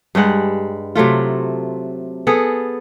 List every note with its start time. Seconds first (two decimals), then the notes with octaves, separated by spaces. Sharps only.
0.15 G2 G3 G#3 F#5
0.95 C3 F#3 A3 F4
2.27 B3 G#4 A4